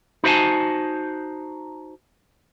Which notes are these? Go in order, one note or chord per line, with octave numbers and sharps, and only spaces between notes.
D#4 F#4 C5 D5 G#5 A5